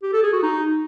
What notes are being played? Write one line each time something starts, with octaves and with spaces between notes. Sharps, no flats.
G4
A4
G#4
F#4
D#4